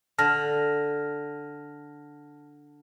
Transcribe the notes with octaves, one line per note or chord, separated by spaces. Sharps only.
D3 A5 F6 A#6